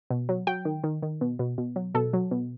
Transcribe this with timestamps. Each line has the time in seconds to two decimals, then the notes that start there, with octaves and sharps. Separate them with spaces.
0.10 B2
0.29 F#3
0.47 F#3 G5
0.65 D#3
0.84 D#3
1.02 D#3
1.21 B2
1.39 B2
1.58 B2
1.76 F#3
1.94 B2 A4
2.13 F#3
2.31 B2